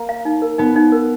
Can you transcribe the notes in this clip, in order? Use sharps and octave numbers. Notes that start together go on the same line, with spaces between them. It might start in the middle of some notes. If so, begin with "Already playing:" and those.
Already playing: A#3
F5
D#4
A#4
B3 D#4
D#4
A#4